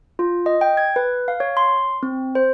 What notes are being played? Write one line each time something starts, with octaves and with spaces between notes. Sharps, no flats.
F4
D#5
G5
G#6
B4
F5
C#5
C6
C4
C5